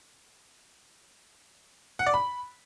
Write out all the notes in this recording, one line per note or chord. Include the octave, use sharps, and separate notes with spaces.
F#5
D5
B5